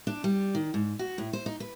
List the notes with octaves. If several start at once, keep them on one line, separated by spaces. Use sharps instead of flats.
D4
G3
D#3
G#2
F#4
A2
C5
D#4
B4